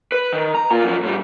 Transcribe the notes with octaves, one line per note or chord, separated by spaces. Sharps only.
B4
D#3
A#5
A#2 F4
F#2 F3
A2 G3